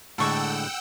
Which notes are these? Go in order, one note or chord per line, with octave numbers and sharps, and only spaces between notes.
A2 D3 G#3 A4 F#5 G5 C#6 E6